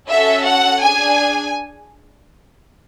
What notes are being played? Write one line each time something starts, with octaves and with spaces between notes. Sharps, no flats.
C#4 F#4 A4 E5
F#5
D4 G#4 G#5